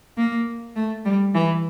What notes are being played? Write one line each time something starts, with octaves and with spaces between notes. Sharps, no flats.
A#3
A3
G3
E3